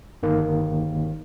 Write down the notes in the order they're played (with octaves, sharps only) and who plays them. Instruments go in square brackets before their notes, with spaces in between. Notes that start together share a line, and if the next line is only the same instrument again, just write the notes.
[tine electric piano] G1 D#3 A#3